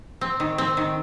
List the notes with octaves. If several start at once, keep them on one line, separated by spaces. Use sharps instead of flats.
C4
D#3
C4
D#3